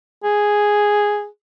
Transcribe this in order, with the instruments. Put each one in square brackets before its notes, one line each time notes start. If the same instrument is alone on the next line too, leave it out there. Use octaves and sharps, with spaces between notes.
[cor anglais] G#4